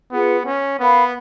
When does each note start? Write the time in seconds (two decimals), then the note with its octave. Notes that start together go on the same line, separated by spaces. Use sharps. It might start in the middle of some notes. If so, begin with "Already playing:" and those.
0.11 B3 F4 G#4 B4 F#5
0.45 C#4
0.79 B3 A#4 F5 B5